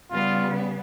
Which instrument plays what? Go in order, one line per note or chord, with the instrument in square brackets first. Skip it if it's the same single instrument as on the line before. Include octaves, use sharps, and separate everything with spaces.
[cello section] C#3 G3 B3 [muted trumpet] F4